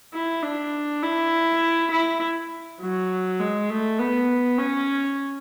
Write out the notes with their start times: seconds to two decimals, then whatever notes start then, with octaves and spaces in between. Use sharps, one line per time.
0.14 E4
0.43 D4
1.03 E4
1.92 E4
2.81 F#3
3.40 G#3
3.70 A3
3.99 B3
4.58 C#4